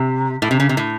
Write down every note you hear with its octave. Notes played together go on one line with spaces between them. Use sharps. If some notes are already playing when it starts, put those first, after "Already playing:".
Already playing: C3
A2
C3
C#3
C3
A2